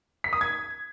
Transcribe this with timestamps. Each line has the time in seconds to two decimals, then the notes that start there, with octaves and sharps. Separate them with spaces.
0.24 B6
0.33 D#6
0.41 G#6